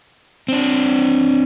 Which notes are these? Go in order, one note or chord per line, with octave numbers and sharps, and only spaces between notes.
C4 D4